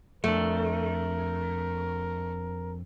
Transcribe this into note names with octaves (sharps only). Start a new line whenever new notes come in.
F2 A3 D4 A#4